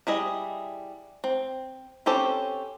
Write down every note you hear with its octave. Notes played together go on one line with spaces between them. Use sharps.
G3 E4 G#4 D#5
C4
C4 C#4 G4 A4 C5